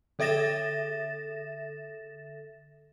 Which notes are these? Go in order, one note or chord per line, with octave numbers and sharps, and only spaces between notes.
D3 A4 E5 A6 A#6 E7